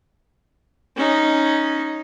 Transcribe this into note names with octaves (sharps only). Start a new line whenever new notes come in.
C#4 D#4